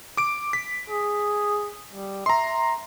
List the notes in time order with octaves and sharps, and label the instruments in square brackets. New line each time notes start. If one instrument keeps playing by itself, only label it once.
[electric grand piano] D6 D7
B6
[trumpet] G#4
G3
[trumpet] E5 [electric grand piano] A#5 C6